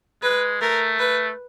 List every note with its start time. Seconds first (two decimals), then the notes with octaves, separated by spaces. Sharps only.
0.22 G#3 B4
0.61 A3 A#4
0.99 B4